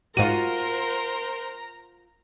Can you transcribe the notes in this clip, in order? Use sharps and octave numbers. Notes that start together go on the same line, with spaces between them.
G#2 F4 F#4 A#4 C5 A#5 D#7